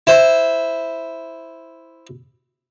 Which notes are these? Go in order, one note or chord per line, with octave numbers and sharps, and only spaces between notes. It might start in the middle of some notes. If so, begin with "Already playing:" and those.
E4 C5